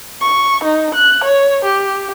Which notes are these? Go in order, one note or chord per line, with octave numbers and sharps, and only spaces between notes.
C#6
D#4
F#6
C#5
G4